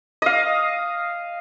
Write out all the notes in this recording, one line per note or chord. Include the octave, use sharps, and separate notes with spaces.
D#5 F5